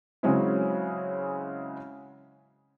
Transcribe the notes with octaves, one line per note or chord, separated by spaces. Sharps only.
C#3 F#3 G#3 C4 C#4 E4